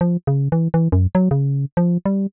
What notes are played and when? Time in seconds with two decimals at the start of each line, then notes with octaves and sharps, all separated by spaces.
0.01 F3
0.27 C#3
0.52 E3
0.74 E3
0.92 F#2
1.15 F#3
1.31 C#3
1.77 F3
2.06 G3